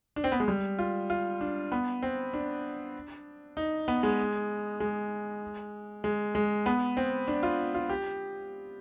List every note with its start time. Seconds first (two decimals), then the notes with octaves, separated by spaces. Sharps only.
0.16 D4
0.24 C4
0.32 B3
0.40 G#3
0.48 G3
0.79 F4
1.10 F4
1.41 D4
1.72 B3
2.02 C4
2.33 D4
3.57 D#4
3.88 B3
4.03 G#3
4.80 G#3
6.04 G#3
6.35 G#3
6.66 B3
6.97 C4
7.28 D4
7.43 F4
7.74 F4
7.89 G4